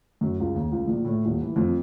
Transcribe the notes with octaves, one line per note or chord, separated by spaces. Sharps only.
F#2
C#2
D#2
C#2
A#1
A2
D#1
E3
F2